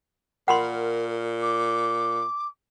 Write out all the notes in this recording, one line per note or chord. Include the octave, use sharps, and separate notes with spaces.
A#2 A#4 F#5 B5 C6
D6